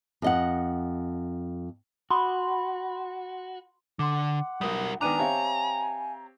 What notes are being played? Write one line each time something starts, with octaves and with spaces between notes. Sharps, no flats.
F2 D#5 F#5
F#4 B5 C6
D3 F#5 C6 D6
B1 G3 A#4 D#6
D#3 B3 D4 G#5 A#5 D6 F#6 D#7
C4 G4 C#5 E5 F5 A5